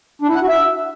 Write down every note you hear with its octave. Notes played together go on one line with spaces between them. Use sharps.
D4
E4
F#5
F#4
E5